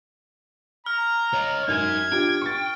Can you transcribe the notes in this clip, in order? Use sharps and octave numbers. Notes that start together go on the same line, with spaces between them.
A#5 F6
C#5 D#5
F#2 D#4 G#5 G#6
D4 F4 G4 G5
C#6 A6